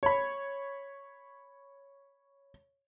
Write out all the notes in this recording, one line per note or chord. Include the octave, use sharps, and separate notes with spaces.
C#5 B5